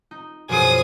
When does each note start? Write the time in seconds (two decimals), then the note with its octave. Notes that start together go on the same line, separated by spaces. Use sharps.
0.11 D#4
0.49 F#2 B2 F3 G#4 D#6